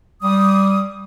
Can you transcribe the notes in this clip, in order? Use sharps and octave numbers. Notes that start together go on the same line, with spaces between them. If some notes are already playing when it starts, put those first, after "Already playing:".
G3 D#6